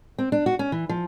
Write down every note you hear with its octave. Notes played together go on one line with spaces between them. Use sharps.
C4
D4
F#4
C#4
E3
F3